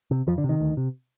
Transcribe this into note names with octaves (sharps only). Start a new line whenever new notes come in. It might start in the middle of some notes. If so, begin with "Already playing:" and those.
C3
F2 F3
D3
C3
D#3
D2
C3